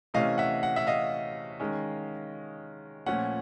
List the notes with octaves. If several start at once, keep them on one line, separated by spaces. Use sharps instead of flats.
C3 E3 A3 C#4 D#5 F5
E5 F#5
F#5
E5 F#5
D#5 F5
D#3 G#3 C#4
A#2 F3 A3 C#4 F#5